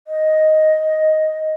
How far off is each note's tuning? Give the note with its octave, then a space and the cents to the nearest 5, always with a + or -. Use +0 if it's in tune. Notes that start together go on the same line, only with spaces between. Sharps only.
D#5 +5